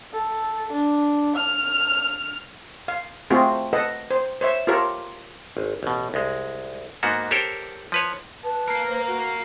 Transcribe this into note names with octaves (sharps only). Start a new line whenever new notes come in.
A4
D4
F6
F5
A3 C4 F4 F#4 G#4
A4 B4 D#5 F#5
C5
C5 C#5 E5
F4 G4 A4 A#4 C#5
G#1
A1 B2
C2 G#3
G#2 A#3 B3 F#4
G4 A4 A#4 C5 C#5 G5
F3 B4 C#5
B4 A5
A#4 F5
C5
F#4